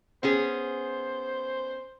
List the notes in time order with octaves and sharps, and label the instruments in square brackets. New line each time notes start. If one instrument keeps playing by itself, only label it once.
[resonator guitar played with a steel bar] B3 C#4 G#4 [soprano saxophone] C5